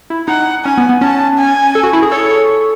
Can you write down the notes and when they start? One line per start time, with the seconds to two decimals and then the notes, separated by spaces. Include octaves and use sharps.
0.10 E4
0.28 D#4 F#5
0.64 C#4 G#5
0.78 B3
0.89 B3
1.01 C#4 A5
1.38 G#5
1.75 A4
1.83 F#4
1.93 E4
2.02 G#4
2.11 A4 C#5